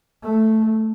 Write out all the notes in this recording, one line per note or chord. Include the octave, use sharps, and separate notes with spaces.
A3